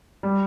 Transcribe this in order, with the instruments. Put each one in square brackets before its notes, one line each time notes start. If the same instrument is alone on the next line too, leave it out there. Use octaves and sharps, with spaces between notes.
[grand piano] G3